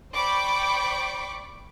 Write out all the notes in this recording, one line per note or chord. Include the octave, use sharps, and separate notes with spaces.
C5 D5 G5 B5 C#6 D6